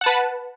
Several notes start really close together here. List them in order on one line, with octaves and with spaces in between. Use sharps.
F#5 A5 B4